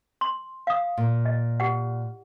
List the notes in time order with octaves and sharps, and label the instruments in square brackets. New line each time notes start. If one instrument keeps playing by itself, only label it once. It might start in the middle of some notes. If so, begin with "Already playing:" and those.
[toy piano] C6
F5 D#6
[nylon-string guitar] A#2
[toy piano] D#5
G4 F#5